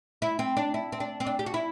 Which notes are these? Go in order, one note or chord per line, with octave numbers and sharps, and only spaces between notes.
E4
C4
D4
E4
C4
D4
C4
D4
G4
F#4
E4